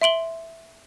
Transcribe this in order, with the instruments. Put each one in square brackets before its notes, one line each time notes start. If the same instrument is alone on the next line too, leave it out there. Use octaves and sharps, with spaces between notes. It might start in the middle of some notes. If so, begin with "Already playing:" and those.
[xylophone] E5 C6 D7 F#7 G7